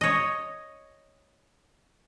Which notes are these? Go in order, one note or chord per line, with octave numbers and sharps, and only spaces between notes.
C#5 D#5